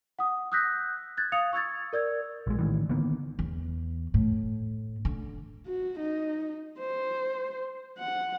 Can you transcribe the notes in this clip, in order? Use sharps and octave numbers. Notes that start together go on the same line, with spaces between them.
F#5 D#6
D#6 E6 F#6 G6 A#6 B6
F#6 G#6 A6
F5 D#6 C#7 F7
C#6 E6 G#6 A6
A#4 D5 E6 G#6
A#1 G#3
A2 D#3 E3
D3 D#3 A#3 B3
E2
A2
D3
F#4
D#4
C5
F#5